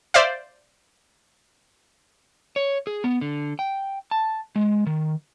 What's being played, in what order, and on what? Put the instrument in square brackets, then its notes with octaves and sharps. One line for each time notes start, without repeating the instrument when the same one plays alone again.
[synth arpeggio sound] C5 D5 E5 F5
[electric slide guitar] C#5
G#4
B3
D3
G5
A5
G#3
D#3